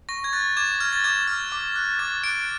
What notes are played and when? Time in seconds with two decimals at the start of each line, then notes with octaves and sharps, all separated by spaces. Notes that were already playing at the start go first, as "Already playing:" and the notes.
0.09 C#6 A#6
0.24 G#6
0.33 F#6 A6
0.57 D6 G#6
0.80 F6 G#6
0.93 A6
1.04 D6 G#6
1.28 F6
1.52 D6
1.76 F#6
1.99 D6 A6
2.24 F#6 D7